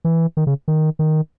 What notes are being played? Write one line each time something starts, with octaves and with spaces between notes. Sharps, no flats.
E3
D#3
C#3
D#3
D#3